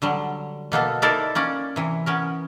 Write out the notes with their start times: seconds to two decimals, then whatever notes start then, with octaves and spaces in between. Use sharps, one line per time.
0.02 D3 F#3 G3
0.72 B2 A#3 B3 A4
1.02 D#4 E4 A4 A#4 C5 D5
1.35 A#3 C#4 D5
1.76 C3 E3
2.06 B3 C#4 A#4